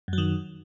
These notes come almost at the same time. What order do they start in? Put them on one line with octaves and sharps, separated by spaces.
F#2 F#3 D#3